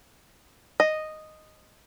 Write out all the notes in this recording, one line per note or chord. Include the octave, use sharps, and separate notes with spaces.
D#5